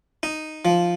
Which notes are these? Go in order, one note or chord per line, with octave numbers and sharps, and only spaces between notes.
D#4
F3